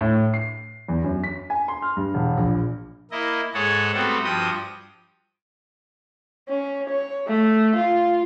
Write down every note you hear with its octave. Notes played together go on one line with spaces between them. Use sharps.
A2
C7
E2
F#2
B6
G#5
C6
F6
G2
E1
A#1
A#3 E4 D#5
G#2 G#4 A4 C#5 F#5
G3 A3 B3 C4 F#4 A4
G2 F3 F#4 G5 D#6
C#4
C#5
A3
F4